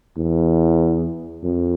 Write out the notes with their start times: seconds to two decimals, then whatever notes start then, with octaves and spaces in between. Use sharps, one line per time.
0.17 E2
1.44 F2